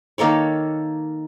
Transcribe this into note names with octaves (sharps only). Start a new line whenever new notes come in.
D#3 A#3 A4 C#5